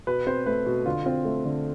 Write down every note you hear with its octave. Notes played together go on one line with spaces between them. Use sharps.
B2 B4
C4 C5
A3 B4
B2
D3 F4
C4 F4
A3
D3